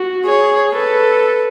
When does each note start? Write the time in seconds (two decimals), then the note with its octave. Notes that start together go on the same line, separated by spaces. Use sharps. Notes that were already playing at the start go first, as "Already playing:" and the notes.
Already playing: F#4
0.26 G#4 C#5
0.74 A4 B4